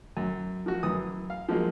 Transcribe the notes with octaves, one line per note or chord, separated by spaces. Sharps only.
F#2
F3 F#4
F#2 E3 D#6
F5
F3 F#3 G#3 A#3